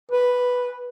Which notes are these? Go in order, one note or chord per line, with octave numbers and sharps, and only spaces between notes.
B4